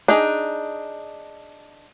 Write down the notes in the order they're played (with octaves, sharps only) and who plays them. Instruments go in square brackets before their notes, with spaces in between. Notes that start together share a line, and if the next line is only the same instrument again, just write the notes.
[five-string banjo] D4 D#4 G#4